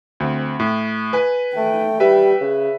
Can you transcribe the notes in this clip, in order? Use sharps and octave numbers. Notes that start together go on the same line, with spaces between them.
D2 C4
A2
B4 G#5
A3 G5
G3 B4 E5
C#3